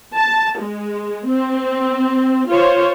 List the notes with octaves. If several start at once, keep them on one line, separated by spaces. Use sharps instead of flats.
A5
G#3
C4
F4 C5 C#5